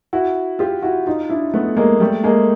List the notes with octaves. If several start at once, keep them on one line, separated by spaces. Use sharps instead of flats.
E4 F#4
F4 G4
E4 F#4
D#4 F4
D4 E4
A3 B3
G#3 A#3
G3 A3
G#3 A#3